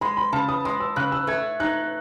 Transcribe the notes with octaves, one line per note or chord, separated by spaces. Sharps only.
G#3 B5
B5
C#3 A5
D#6
G#3 D#6
E6
C#3 F#6
E6
A3 G#6
D#4 F#6